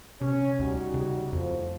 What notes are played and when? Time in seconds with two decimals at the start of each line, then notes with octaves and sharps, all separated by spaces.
0.21 C3 C#4
0.60 D2 G3 D#4 F#4
0.94 C#3
1.33 F2 A2 F3